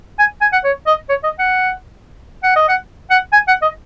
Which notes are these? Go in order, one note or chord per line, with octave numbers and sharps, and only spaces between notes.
G#5
G#5
F#5
C#5
D#5
C#5
D#5
F#5
F#5
D#5
F#5
F#5
G#5
F#5
D#5